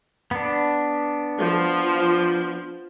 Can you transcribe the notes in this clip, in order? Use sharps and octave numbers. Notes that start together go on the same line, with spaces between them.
B3 D4
F3